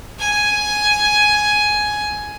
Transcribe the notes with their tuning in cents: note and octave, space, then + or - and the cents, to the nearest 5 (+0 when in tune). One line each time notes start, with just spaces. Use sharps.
G#5 +10